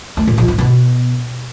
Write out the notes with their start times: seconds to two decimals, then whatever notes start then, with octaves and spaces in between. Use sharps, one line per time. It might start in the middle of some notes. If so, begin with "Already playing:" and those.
0.17 A3
0.27 A#2
0.38 F3
0.48 G#2
0.58 B2